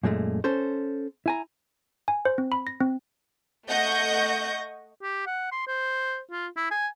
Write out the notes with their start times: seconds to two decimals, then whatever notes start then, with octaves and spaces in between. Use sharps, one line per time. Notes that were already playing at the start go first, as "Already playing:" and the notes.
0.03 F#2 A#2 G#3 A3
0.44 C#4 A4 C5
1.26 E4 G#5 A#5
2.08 G#5
2.25 C5
2.38 C4
2.52 B5
2.67 A#6
2.80 C4
3.69 A3 D#5 F#5 C#6 G6 A#6
5.02 G4
5.26 F#5
5.52 C6
5.67 C5
6.31 F4
6.57 E4
6.71 G#5